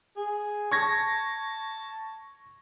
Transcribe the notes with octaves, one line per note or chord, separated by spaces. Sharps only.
G#4
A5 C#6 G#6 A#6